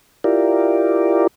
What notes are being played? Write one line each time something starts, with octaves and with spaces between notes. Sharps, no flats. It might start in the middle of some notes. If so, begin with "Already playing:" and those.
E4 F4 G4 A#4 D5